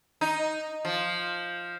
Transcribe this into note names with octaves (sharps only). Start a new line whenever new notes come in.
D#4
F3